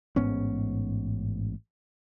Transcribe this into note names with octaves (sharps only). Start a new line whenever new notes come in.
A1 G#2 B3 C#4